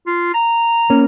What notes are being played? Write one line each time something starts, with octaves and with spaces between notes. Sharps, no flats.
F4
A#5
A#3 C#4